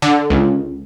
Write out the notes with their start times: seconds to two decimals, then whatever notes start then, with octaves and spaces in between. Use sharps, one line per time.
0.02 D3
0.30 C#2